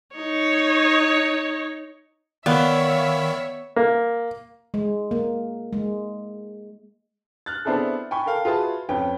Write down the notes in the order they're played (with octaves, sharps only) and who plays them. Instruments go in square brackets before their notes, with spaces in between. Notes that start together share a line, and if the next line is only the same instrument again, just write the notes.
[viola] D#4 C#5
[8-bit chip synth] D#3 [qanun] B3 [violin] C#5 E5 [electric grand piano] D5 F5 B5
[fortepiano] A#3
[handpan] G#3
A#3
G#3
[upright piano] F6 F#6 A6
B3 C4 D4 E4 G#4 A4
G5 G#5 B5 C#6
A4 A#4 F5 G5
F4 F#4 G#4 B4 E5 A5
F2 C#4 B4 G5